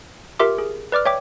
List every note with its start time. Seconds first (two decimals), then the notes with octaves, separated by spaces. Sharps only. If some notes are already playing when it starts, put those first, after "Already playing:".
0.39 F4 G4 A#4 E5 C6 D6
0.58 G#4 A#4
0.92 B4 D5 D6 F6
1.05 C#5 E5 G5 D6